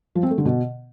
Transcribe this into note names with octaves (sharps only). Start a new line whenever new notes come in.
F3
C4
A3
D3
B2